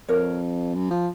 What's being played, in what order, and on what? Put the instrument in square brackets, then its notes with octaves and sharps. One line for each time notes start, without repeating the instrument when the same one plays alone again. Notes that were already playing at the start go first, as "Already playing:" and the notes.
[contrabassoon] F2 [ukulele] A#4 C#5
[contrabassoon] F#2
F3